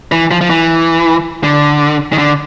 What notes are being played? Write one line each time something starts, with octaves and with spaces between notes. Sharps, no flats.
E3
F3
F3
E3
D3
D#3
D3